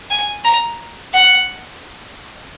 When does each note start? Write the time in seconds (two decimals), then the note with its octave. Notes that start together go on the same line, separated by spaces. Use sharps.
0.10 G#5
0.44 A#5
1.13 F#5